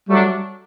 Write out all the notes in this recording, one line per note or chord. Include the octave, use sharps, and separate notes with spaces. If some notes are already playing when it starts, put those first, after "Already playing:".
F#3 G3 A3 D4